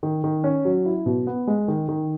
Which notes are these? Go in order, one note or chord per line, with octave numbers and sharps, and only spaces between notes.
D#3
D#3
C#4
F#3
E4
B2
B3
G#3
D#3
D#3